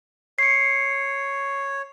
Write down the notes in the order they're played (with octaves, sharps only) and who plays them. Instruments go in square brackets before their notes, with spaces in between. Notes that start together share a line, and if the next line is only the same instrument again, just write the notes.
[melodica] C#5 [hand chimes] C7 C#7